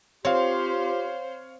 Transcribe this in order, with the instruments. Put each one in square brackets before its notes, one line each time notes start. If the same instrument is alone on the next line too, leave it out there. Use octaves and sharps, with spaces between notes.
[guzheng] C4 [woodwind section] F4 G4 [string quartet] C5 [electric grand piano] C#5 F5